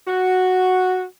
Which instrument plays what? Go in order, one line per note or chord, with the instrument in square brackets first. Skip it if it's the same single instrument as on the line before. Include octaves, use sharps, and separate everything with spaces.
[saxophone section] F#4